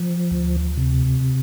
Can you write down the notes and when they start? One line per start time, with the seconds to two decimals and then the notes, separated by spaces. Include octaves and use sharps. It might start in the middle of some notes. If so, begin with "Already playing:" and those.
Already playing: F3
0.31 D2
0.77 C3